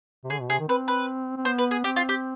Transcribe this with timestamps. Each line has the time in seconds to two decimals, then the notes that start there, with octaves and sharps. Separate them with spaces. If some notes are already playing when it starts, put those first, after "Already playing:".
0.24 C3
0.30 D3 G#4
0.41 B2
0.49 C3 G#4
0.60 D#3
0.68 C4 B4
0.88 B4
1.37 C4
1.45 B3 C5
1.58 B4
1.71 G#4
1.84 C4 G4
1.96 F4
2.09 G4